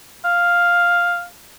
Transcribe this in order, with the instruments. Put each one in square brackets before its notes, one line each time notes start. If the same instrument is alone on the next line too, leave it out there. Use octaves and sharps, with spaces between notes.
[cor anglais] F5